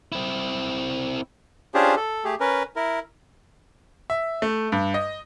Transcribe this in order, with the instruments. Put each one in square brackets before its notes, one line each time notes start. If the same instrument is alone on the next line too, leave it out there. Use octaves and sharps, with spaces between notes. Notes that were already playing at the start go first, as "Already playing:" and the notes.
[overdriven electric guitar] C4 E4
[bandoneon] C#4 D4 F4 G4 G#4 C5
A4
A3 G4 G#4
C#4 A#4 B4
E4 A#4
[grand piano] E5
A3
G2
D#5